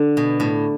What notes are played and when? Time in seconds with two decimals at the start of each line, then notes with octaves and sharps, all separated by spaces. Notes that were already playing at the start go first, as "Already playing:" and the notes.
Already playing: D3
0.17 B2
0.40 A2